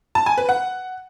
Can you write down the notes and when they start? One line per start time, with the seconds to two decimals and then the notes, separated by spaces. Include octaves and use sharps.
0.15 A5
0.26 G#5
0.38 B4
0.49 F#5